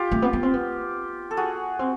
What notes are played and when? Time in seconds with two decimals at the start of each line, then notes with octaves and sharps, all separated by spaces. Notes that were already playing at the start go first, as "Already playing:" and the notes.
Already playing: F4 G4
0.11 A3
0.22 B3
0.33 B3
0.43 C4
0.54 B3
1.31 A4
1.37 F#4 G#4
1.79 C4